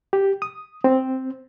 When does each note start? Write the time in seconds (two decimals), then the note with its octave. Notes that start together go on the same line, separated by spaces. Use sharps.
0.13 G4
0.42 D#6
0.84 C4